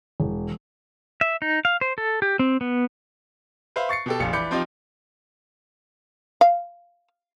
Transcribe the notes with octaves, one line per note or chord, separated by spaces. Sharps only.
E1
E5
D#4
F5
C5
A4
G4
C4
B3
B4 C5 E5 F5
C#6 A6 C7 C#7
B2 G4 A4
F1 A#1 F5 C#7
E3 D5 B5 D6 G6 C#7
F3 C4 D#4 F4 G4
F5